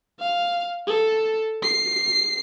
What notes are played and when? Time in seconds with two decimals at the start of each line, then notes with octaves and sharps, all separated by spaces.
0.20 F5
0.87 A4
1.63 C7